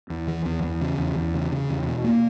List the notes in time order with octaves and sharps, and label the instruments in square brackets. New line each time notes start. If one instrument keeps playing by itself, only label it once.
[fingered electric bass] E2
E3
E2
E2
C#3
E2
E2
C#3
C#3
E2
B2
A#3